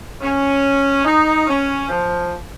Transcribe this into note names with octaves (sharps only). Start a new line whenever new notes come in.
C#4
D#4
C#4
F3